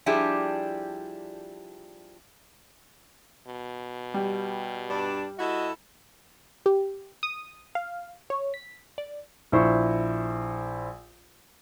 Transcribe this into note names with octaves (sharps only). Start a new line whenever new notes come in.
F3 G3 D4 E4 G4 G#4
B2
G3
G2 D4
E4 F#4 A4 D#5
G4
D#6
F5
C#5
B6
D5
A#1 E4 C5 C#6